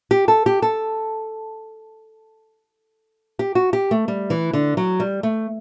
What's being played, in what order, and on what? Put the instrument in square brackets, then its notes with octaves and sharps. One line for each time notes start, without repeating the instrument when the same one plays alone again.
[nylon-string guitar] G4
A4
G4
A4
G4
F#4
G4
A3
G3
E3
D3
F#3
G3
A3